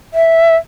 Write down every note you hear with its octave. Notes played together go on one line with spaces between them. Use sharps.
E5